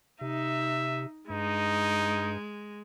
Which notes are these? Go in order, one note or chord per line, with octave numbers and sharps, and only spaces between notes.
C3 D#4 E5
G2 G#3 D#4